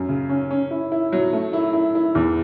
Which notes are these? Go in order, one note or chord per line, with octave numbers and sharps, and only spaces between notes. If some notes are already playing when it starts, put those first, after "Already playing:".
Already playing: F#2
C#3
C#4
C#4
E4
E4
F#3
A3
E4
E4
E4
E2